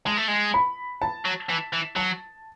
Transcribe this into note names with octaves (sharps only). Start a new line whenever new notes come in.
G#3 A5
A3
G#3
B5
A5
F#3
E3
E3
F#3 A5